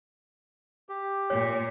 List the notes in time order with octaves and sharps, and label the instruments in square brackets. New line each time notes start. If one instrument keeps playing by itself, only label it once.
[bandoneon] G4
[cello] A#2 [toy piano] C#5